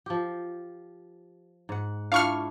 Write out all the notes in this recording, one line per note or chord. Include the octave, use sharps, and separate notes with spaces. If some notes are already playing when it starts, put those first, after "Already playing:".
F3 G4
G#2 F#5
D4 E4 F4 F5 C#6 F6